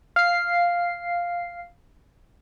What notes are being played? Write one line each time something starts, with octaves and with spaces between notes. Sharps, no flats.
F5 C7